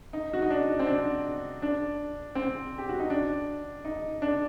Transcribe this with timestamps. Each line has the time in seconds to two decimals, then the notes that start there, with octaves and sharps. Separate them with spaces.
0.13 D#4
0.33 F#4
0.42 D#4
0.50 D4
0.79 C4
0.87 D4
1.62 D4
2.35 C4
2.78 G4
2.89 F#4
3.00 D#4
3.10 D4
3.85 D#4
4.22 D4